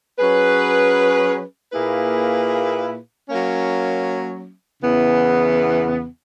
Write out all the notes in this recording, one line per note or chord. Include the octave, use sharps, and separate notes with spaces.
F#3 C#4 G#4 B4
A#2 A#3 E4 G#4 B4
F#3 A#3 C#4
E2 C#3 E3 B3